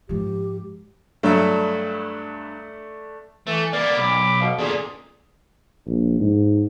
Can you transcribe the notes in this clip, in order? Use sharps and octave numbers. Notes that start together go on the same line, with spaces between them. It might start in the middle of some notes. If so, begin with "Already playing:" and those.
G#2 F3 G4
G2 F#3 A3 D4 E5
E3 A3
A#3 B3 D5
B1 B5 D6
B2 F5
E2 A#2 D3 C#4 G#4
A#1
G#2